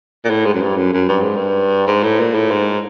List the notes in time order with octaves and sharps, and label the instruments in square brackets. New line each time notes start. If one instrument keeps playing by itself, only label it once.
[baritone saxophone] A#2
A2
G#2
F#2
G2
F#2
F#2
G2
G#2
G2
G#2
A2
A#2
A2
G#2